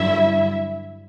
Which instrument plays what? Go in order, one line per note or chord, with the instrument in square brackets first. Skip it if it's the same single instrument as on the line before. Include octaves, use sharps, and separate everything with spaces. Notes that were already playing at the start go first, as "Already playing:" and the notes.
Already playing: [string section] G2 D3 F#3 E4 E5